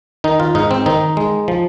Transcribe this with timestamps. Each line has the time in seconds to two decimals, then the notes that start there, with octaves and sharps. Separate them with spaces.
0.24 D#3 D#4
0.40 F4
0.55 G#2 D#4
0.71 C4
0.86 D#3 D#4
1.17 G#3
1.48 F3